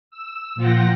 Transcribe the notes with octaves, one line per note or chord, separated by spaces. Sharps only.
E6
A#2 F3 F4 F#5 G5 A#6